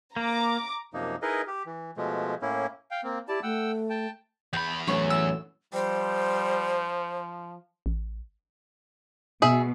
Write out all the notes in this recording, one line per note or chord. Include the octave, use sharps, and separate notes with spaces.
A#3 A#5 D6
F#2 C3 F3 A#3 D#4
D#4 E4 G#4 A#4 B4 D#5
G4
E3
B2 F3 G#3 A3
A2 A#3 C#4 E4
F5 G5
A#3 C4
E4 G4 D5 A5
A3 F#5 G5 E6
G5 A5
E2 G5 B5
F#2 A2 E3 C#5 C#6
E6
F3 G3 C5
A1
B2 G#4 E5